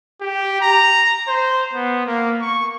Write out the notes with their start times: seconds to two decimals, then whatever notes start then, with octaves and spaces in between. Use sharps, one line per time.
0.21 G4
0.61 A#5
1.28 C5
1.73 B3
2.06 A#3
2.41 C#6